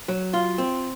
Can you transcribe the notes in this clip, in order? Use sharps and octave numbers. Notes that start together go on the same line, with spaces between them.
F#3
F4
C4